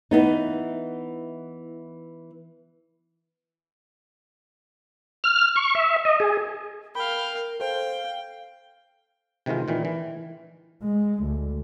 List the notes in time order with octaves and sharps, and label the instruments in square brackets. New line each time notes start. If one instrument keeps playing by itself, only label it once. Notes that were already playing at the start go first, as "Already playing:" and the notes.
[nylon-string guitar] E3 B3 D#4
[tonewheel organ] F6
C#6
E5
D#5
G#4
[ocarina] A#4 [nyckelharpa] F5 G5 [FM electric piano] B5
[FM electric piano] A4 C5 [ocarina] F5 [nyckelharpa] G5
[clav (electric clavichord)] C3 D#3 E3 G#3 F4
A#2 D#3 E3
E3
[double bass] G#3
D2